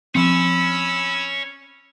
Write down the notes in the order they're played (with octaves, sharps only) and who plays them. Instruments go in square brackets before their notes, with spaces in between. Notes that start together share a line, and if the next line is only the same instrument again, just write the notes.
[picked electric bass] F3 C4 [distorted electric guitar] C#4 [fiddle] B5 E6